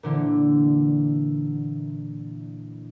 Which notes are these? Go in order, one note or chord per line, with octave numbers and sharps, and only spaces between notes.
A#2 D3 E3